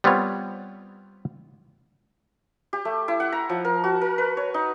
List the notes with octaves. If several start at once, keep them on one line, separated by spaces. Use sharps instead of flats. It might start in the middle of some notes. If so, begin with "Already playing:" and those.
G3 B3 C4 F4 C#5
G4
A3
E4
F#5
A#5
F3
A#4
F#4
A#4
B4
C#5
D#4